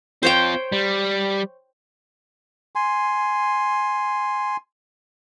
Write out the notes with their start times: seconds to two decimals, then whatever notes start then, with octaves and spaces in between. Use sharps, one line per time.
0.23 C4 F4 C5 C#5 G5
0.72 G3
2.75 G#5 C6